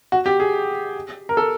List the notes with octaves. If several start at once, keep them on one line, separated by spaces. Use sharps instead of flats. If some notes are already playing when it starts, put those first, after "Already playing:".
F#4
G4
G#4
A#4
A4